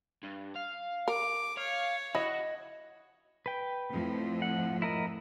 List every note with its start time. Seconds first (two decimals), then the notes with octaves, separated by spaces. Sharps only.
0.23 G2
0.56 F5
1.08 A#4 D6
1.58 C#5 F5
2.15 E4 F#4 D#5
3.46 B4 G5
3.91 F2 A2 F3
4.42 F#5
4.82 E4 A#4 D#5